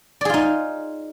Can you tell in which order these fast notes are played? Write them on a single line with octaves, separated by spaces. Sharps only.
D5 G#4 F4 D#4